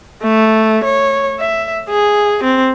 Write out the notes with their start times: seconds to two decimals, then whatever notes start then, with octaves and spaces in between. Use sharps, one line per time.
0.23 A3
0.84 C#5
1.40 E5
1.89 G#4
2.43 C4